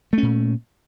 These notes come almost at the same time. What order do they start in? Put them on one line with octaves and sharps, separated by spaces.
A3 C#4 A#2